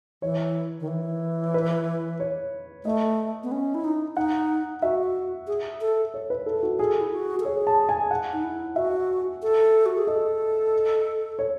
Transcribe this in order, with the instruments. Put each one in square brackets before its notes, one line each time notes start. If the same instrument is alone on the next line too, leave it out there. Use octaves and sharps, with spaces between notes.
[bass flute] E3 [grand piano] C#5
[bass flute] D#3
E3
[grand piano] B4
C#5
[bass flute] A3 [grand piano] D#5
[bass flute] B3
C#4
E4
D#4
[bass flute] D#4 [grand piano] F#5
[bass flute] F#4 [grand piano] E5
[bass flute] G#4
A4
[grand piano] C#5
B4
A4
F#4
[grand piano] G#4 [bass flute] A4
[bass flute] E4
F#4
A4
[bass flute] G#4 [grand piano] C#5
[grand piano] A5
G#5
F#5
[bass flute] D#4
E4
[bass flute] F#4 [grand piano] E5
[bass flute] A4
F#4
G#4
[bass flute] A4 [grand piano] D#5
[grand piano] C#5